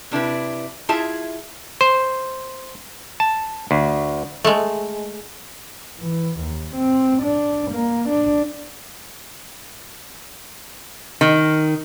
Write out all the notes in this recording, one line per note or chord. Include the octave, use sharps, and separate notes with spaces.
C3 D4 E4 B4
E4 F4 G#4 E5 A5
C5
A5
D2
G#3 A3
E3
D#2
C4
D4
A#3
D4
D#3